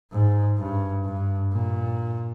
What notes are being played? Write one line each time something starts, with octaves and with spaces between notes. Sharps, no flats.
G#2
G2
G2
A#2